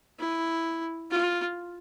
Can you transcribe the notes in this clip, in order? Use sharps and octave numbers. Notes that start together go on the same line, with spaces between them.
E4
F4